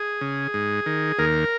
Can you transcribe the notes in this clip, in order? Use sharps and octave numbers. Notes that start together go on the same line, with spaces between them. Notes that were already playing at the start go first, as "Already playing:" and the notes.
Already playing: G#4
C#3
G#2
D#3
D#2 A#4